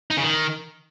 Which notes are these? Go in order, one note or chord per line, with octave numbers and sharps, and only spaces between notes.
D#4
C#3
D#3